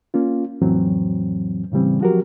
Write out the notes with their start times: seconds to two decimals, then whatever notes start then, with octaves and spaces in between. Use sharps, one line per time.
0.14 A#3 C#4 F4
0.61 F2 A2 E3 F#3 C4
1.72 A2 C#3 E3 G3 C4
2.01 F3 F#3 F#4 G4 A#4